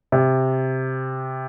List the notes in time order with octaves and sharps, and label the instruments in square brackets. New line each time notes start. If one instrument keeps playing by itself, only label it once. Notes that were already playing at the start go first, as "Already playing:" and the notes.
[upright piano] C3